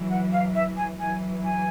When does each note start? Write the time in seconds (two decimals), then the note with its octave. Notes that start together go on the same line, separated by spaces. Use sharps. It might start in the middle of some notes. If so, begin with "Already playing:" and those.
Already playing: E3 F#3
0.10 F#5
0.32 F5
0.55 E5
0.77 G#5
0.99 E3 F#3 G#5
1.44 G#5